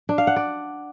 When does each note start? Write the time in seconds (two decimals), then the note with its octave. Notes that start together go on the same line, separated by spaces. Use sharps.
0.09 D4
0.18 F5
0.27 F#5
0.36 D5